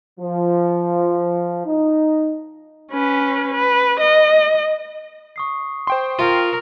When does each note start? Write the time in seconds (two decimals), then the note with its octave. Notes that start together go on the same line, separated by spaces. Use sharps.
0.20 F3
1.66 D#4
2.92 C#4 B4
3.55 B4
4.01 D#5
5.36 C#6 D#6 C7
5.87 C5 G5 C6
6.19 F4 A#4